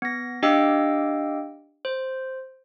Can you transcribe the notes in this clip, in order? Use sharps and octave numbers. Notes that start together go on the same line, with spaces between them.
B3 A#6
D4 G4 D#5 F5 G5 E6
C5